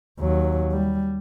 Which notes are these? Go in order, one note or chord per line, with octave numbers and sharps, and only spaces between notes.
D#2 F#3
G3